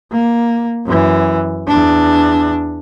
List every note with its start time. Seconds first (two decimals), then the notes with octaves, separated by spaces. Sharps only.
0.12 A#3
0.86 F#2 E3
1.67 E2 D4